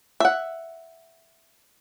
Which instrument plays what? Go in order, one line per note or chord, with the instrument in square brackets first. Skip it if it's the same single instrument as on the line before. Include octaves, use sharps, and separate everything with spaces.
[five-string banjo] E5 F#5